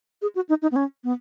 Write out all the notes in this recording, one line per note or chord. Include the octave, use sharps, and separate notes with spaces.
G#4
F#4
D#4
D#4
B3
C#4
B3